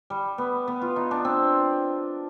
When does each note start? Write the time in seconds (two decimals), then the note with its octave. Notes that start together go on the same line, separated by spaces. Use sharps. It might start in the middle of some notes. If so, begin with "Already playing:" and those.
0.10 G3
0.38 B3
0.68 B3
0.81 F4
0.96 D#4
1.11 D4
1.25 C4